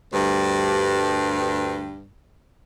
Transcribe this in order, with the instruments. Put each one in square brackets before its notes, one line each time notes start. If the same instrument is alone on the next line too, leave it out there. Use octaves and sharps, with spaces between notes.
[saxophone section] D2 G2